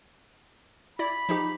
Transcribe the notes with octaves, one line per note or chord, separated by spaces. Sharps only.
E4 D5 B5
F3 D#4 G4